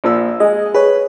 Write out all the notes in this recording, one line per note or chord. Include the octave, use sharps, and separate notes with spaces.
A#1 F3 E6
G#3 D#5 G#5
G#4 B4 C#5